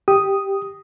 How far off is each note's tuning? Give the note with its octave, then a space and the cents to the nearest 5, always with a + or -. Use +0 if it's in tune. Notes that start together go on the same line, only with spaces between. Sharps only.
G4 +0 D#6 +0